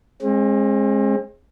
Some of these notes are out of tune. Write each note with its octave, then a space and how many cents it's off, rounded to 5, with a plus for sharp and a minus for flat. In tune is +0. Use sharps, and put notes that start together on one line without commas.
G#3 +0 C4 +40